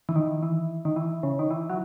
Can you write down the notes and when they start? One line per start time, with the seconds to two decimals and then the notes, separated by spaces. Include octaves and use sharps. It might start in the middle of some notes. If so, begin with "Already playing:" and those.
0.09 E3
0.16 D#3
0.43 E3
0.85 D#3
0.96 E3
1.23 C#3
1.39 D#3
1.51 E3
1.70 F#3